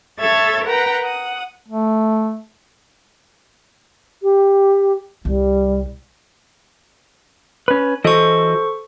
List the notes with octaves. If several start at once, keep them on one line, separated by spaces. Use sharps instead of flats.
A4 C#5 E5 G#6 A6
A#4 B4 F#5 G5 A#5
F#5 D#6
A3
G4
C2 G3
C#4 B4
E3 F#4 A4 C5 D#5 C#6